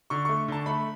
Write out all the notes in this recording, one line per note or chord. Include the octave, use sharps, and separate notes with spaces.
D3 C#6
A3 C#6
D3 A5
A3 B5